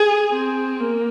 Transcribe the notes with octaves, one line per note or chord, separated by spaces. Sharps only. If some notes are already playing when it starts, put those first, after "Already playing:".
Already playing: G#4
C4
A#3